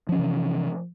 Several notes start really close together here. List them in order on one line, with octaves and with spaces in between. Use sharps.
F3 C#4 E3 C3